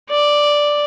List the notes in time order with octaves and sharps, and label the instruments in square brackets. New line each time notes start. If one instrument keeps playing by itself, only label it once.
[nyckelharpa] D5